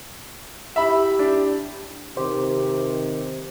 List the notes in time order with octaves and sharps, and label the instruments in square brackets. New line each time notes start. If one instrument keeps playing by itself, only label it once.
[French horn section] E4 G4 [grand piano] E5 B5
[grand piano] D4
[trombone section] C3 D#3 [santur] G4 [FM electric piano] C5